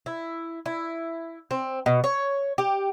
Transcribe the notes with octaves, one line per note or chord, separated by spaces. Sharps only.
E4
E4
C4
B2
C#5
G4